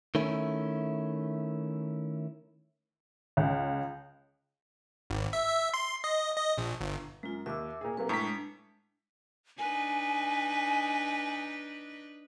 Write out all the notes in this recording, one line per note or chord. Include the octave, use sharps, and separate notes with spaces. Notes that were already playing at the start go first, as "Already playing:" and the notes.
D#3 A3 C#4 E4
C#2
G#1
E5
E5
C6
D#5
D#5
A#1
G1
F#2 G#3 F4
D#2 E5 D6 E6
A#2 G#4
C3 F#3 A#3 B4
A2 G#3 D4 A5 A#5 B6
D4 D#4 B4 G#5